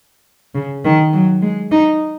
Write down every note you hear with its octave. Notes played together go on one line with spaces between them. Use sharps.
C#3
D#3
F#3
G#3
D#4